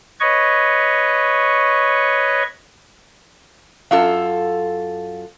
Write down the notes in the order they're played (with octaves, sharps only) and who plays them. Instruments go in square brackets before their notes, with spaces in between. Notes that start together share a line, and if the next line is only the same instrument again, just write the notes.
[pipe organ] B4 C#5 D#5 C#6
[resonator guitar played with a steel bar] F#2 F4 A4 [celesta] F5